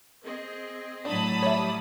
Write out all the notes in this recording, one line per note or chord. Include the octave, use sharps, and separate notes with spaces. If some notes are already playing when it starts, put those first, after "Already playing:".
C4 G#4 D#5
A2 F#3 D4 A5 B5 D#6
G3 C#5 E5